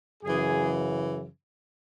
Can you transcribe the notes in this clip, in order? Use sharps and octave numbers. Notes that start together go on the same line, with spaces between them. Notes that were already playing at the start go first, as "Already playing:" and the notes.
F#2 C#3 E3 G#4